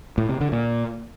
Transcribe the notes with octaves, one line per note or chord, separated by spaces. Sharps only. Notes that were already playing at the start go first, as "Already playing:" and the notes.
A2
C3
D3
A#2